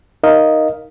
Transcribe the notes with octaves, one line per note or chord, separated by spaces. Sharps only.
D#4 A#4 D#5 F5